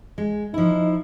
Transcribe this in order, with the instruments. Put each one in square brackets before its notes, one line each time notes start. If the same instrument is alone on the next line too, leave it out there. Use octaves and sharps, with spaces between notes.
[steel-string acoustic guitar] G#3
[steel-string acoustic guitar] F3 E4 [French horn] D#4